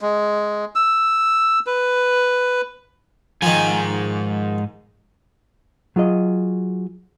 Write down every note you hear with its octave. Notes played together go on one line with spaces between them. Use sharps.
G#3
E6
B4
G#2 D#3 F3 G#5
F#3 F4 G#4 D#5